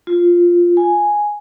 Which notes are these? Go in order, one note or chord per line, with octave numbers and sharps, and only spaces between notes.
F4
G#5